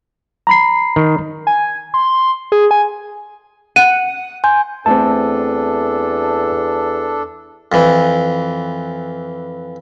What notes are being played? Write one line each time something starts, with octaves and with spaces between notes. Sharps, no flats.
A#5 B5 C7
D#3
G#5
C6
G#4
G#5
F#5 D#7
G#5 C6 G6
E2 A3 C4 D4 A4 A5
F2 E3